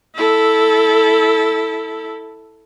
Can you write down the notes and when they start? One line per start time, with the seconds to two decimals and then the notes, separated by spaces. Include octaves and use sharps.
0.15 E4 A4